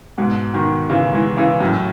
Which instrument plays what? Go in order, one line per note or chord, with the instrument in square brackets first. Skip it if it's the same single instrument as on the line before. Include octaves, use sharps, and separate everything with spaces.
[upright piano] G#2 B2
B2 D#3
C#3 E3
E3 G#3
C#3 E3
F#2 A2